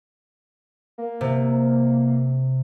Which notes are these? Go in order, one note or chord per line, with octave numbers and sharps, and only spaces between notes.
A#3
C3